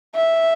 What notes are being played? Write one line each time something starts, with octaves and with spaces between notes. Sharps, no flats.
E5